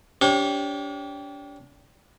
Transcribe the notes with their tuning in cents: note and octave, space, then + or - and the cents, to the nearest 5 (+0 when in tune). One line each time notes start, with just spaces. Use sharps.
D4 -40 G4 +0 C#5 -40